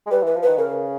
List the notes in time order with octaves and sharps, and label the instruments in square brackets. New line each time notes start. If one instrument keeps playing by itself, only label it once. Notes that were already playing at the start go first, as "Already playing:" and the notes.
[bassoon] G#3
[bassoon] G3 [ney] B4
[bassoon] E3 [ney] B4
[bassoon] F3
[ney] B4
[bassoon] D#3
[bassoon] C#3 [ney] A#4